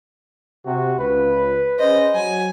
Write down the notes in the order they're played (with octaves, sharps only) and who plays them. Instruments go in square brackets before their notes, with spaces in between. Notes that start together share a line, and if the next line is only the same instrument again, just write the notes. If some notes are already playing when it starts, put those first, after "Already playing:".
[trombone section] C3 [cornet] F#4
[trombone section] C#2 [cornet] B4
[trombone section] C#4 G#4 C5 [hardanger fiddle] D#5
[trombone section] F#3 [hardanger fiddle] G#5